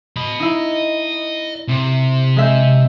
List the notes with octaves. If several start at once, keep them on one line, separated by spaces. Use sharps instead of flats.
D#5 B5
D#4 E4
C3
G#3 E5 G6